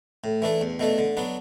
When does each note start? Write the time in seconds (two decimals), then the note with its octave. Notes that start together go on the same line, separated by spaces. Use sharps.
0.24 A2
0.42 E3 A3 D4
0.61 E2
0.79 B2 A3 D4
0.98 D3
1.17 F#3 B3 D4